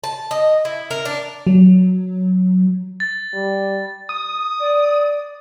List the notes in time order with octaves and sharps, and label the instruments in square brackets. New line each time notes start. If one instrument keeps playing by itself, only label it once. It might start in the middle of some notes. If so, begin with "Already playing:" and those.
[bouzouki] A5
D#5
E4
A#4
D4
[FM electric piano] F#3
[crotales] A6
[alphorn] G3
[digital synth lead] D#6
[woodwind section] D5